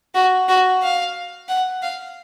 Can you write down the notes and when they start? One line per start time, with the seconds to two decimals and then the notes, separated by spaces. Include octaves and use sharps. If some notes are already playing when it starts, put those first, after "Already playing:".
0.14 F#4
0.49 F#4
0.83 F5
1.49 F#5
1.82 F5